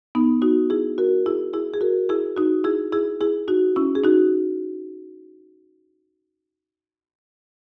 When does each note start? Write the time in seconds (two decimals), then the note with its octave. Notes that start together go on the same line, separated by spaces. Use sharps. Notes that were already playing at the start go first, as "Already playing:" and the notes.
0.15 B3 D#4
0.42 D#4 F#4
0.70 E4 G#4
0.98 F#4 A#4
1.26 E4 G#4
1.53 E4 G#4
1.74 G#4
1.81 F#4 A#4
2.09 E4 G#4
2.36 D#4 F#4
2.64 E4 G#4
2.93 E4 G#4
3.21 E4 G#4
3.48 D#4 F#4
3.76 C#4 E4
3.95 G#4
4.04 D#4 F#4